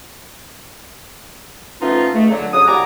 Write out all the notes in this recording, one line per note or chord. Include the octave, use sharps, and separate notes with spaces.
F3 A3 B3 C#4 D#4 F4
C#2 A3
D3 F#3
F2 C#3 F#3 D#6
C2 G3 F#4 G#5 A#5 D6